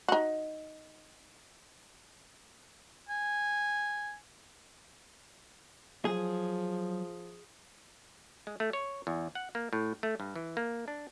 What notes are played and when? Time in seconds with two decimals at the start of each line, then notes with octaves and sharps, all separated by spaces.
0.08 D#4 F#4
3.09 G#5
6.05 F3 F#3 G#4
8.47 G#3
8.60 A3
8.73 C#5
9.07 E2
9.35 F#5
9.55 A#3
9.73 A2
10.03 A3
10.20 G2
10.36 E3
10.57 A#3
10.88 D4